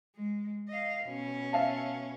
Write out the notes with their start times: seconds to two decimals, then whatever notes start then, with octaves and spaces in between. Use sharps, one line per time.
0.15 G#3
0.68 D#5 F5
1.05 B2 C#4
1.53 E5 F5 A5